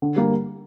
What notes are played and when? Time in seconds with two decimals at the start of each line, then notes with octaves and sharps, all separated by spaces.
0.02 D3
0.16 G3 A#3